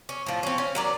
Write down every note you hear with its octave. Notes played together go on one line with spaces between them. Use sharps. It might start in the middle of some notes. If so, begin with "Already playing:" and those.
C#4
A2 F3
C4 C#4
C#4
F#3 A#4 D5